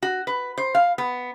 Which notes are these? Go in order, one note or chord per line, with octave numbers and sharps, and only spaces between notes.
F#4
B4
C5
F5
B3